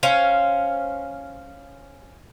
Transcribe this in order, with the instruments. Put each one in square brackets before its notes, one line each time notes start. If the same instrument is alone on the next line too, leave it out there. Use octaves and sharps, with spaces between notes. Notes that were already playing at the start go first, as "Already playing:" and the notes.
[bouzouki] C#4 C5 F5